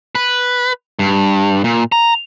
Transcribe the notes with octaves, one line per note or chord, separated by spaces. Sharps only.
B4
G2
A#2
A#5